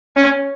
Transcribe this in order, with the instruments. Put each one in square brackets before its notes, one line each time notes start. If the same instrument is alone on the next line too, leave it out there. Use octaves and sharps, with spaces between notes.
[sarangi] C#4